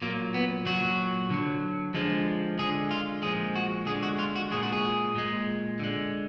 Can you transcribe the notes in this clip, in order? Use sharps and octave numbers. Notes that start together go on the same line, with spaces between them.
A#2 F#3 A#3
B3
A#2 F#3 F#4
D3 F#3
D3 F3 G#3
D3 G#3 G#4
F4
A#2 F3 G#3 G#4
F#4
D3 G#3 G#4
F#4
F4
F#4
A#2 G#3 G#4
F#4
G#4
A#2 G#3
D3 G#3